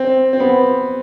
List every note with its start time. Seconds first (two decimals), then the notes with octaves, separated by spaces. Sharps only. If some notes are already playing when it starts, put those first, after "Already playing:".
Already playing: C4
0.33 C4
0.40 B3